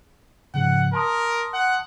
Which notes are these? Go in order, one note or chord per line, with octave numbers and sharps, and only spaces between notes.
G#2 C#3 F3 F#5
A#4 A5 C6 D#6
F#5